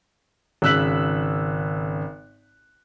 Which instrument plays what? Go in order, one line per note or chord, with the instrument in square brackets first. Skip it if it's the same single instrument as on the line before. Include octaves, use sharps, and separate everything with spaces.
[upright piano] G#1 C#3 E6 F#6 B6 F#7